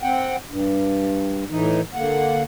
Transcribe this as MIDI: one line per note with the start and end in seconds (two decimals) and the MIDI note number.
0.01 0.36 60
0.01 0.36 78
0.01 0.36 79
0.49 1.44 43
1.50 1.81 45
1.50 1.81 52
1.50 1.81 63
1.94 2.43 50
1.94 2.43 58
1.94 2.43 78